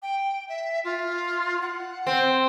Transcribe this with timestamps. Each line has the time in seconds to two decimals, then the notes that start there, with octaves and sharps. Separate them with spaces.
0.02 G5
0.49 E5
0.84 F4
1.61 F#5
2.07 C4